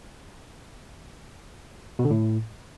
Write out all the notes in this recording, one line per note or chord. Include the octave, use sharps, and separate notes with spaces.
B2
D3
A2